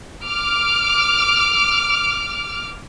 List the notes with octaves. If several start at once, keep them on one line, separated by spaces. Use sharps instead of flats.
D6 F6